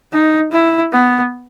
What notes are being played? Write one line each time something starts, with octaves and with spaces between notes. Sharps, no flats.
D#4
E4
B3